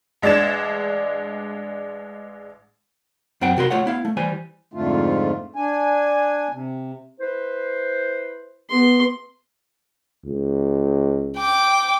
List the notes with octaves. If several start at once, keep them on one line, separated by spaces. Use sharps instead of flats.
A1 G#3 D4 G#6 A6 E7
F#2 C4 C5 F#5 G5
C3 F#4 A#4 C6
A3 F4 C#5 F#5
B3 E4 F5
A3
E3 G3 C5 G#5
F2 G#2 D3 A3 F4
D4 G#5
C3
E4 B4 C5
B3 C6
C#2
G5 D6